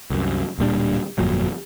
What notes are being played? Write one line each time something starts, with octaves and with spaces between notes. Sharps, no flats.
C2 F#2
D1 A#2 G3 D4
G1 F2 A#2 F#3